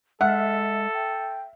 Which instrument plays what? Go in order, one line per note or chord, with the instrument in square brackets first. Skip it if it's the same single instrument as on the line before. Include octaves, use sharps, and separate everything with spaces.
[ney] G#3 [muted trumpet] A4 [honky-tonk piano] E5 F6 [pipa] F#5
[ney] G5